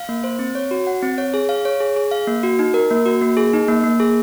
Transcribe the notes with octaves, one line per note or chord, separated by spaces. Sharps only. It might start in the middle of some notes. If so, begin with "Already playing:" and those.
Already playing: F5
A#3
C5
C4
C#5
F#4
F#5
C4
C#5
G#4
F5
C#5
G#4
G#4
F5
A#3
F#4
D#4
A#4
A#3
F#4
A#3
G#4
D#4
A#3
A#3
G#4